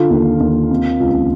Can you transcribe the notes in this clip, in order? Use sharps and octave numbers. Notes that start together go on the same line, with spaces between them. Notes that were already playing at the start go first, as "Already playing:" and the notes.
Already playing: D3 F4
D#2
D#2
C3
C#2